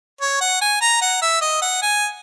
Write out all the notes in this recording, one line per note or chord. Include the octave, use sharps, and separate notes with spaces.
C#5
F#5
G#5
A#5
F#5
E5
D#5
F#5
G#5